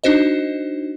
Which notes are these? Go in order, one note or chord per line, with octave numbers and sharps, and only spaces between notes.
D4 D#4 F#4 C5 D#5